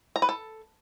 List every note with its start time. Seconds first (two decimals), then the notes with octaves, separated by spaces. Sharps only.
0.16 A#5
0.22 B4
0.29 A4